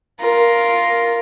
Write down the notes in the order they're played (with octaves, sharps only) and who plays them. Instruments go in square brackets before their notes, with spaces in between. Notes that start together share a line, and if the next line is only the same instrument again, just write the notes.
[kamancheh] F4 A#4